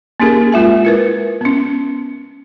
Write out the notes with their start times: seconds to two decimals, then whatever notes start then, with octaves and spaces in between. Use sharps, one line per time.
0.20 A#3 C#4 D#4 G4 G#4 A#4
0.52 G#3 F4 E5 G#5
0.85 E4 A#4 B4
1.41 B3 C#4